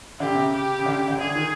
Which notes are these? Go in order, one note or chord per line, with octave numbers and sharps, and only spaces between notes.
D3 G4
C#3
C3
C#3
G4
C#3
D3
C#3
D3
D3 G#4
D#3